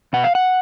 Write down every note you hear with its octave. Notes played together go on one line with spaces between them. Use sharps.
B2 F#5
F5
F#5